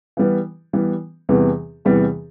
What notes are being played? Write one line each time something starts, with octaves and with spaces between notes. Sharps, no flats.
E3 G3 B3
E3 G3 B3
E2 C3 E3 G3 B3
E2 C3 E3 G3 B3